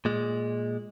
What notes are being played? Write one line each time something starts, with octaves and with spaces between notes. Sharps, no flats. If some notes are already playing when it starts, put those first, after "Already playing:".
A#2 G#3